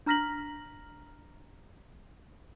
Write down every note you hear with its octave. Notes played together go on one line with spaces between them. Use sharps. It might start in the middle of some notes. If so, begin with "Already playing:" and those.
D4 A#5 F6 A#6 B6 F#7